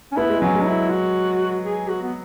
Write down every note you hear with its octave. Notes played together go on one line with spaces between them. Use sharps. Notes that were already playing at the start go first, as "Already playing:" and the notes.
C#4
B3 E4
G#3
F#3 C#4
G#3
E4
F#4
G#4
F#4
B3